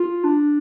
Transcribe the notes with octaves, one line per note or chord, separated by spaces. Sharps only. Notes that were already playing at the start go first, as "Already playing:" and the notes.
Already playing: F4
D4